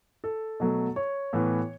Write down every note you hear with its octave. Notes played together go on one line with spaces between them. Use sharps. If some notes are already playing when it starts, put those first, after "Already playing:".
A4
B2 F#3 A3
C#5
A2 E3 B3